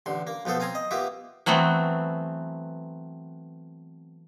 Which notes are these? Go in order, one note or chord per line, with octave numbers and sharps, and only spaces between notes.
A1 D3 C6
A#3
B1 F3 B3 A4 C5
C4 F5 G#5 A#5 C6
D#5
A#3 B3 F4 G4 E5
E3 F#3 A3 B3 C4